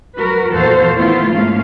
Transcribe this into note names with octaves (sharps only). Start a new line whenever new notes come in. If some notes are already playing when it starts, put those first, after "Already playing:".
F#3 F#4 A#4 B4
E2 A#2 F#4 A4 C5 F5
D#3 A3 B3 E4 F4
G#2 A3 A#3 C#4 F5